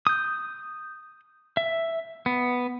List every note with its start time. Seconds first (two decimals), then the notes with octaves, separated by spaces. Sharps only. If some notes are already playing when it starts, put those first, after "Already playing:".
0.07 D#6 G6
1.57 E5
2.26 B3